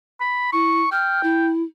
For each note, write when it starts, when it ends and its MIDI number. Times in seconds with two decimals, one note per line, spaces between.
0.21 0.48 83
0.53 0.81 64
0.53 0.87 85
0.92 1.48 79
0.92 1.21 89
1.23 1.63 64